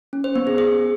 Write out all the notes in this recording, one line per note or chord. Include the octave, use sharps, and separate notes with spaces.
C#4
C5
B3
G#4
G#4